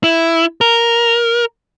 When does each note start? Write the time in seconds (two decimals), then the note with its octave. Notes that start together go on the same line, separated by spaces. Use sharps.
0.04 E4
0.61 A#4